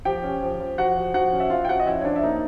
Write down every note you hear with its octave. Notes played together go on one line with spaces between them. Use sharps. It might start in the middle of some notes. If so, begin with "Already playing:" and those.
F3 G4 G5
C#4
F3
F3
F3 F#4 F#5
F3
F3 F#4 F#5
C#4
E5
F3 F4 F5
G5
F3 F#4 F#5
D#5
C#4 E4 E5
C#5
F3 D4 D5
E5
A#3 D#4 D#5